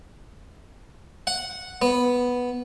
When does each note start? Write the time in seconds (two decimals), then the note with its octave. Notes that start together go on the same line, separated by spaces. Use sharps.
1.27 F#5
1.82 B3